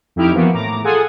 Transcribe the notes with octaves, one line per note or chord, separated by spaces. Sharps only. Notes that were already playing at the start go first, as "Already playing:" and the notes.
F2 D#4 E4 G4 F6 D7
E3 F3 A#3 B3 F#4
A2 A#5 D6
F4 G#4 A4 F#5 G#5 D#6